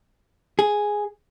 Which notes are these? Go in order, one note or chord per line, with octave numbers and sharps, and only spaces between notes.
G#4